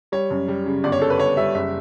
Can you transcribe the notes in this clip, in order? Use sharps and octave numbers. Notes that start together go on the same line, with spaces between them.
G3 C#5
F#2
G3
C#3
G1 D5
C#5
C#3 A4
B4
G1 C#5
G3 E5
F#1 E5